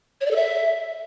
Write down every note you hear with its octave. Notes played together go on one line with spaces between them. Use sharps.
C#5
D5
A4
E5